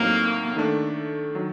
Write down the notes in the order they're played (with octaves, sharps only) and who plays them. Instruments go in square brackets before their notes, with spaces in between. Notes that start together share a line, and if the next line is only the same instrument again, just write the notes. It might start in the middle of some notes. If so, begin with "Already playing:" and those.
Already playing: [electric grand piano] A2 F#3 C4 D#4 [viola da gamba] A#3
[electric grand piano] D#3 A3 D4
D#3 F#3